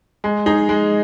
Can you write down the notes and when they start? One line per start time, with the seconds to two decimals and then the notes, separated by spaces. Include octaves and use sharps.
0.24 G#3
0.46 D#4 G#4
0.69 G#3